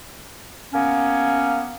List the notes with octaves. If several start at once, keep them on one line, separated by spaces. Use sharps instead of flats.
A#3 B3 C#4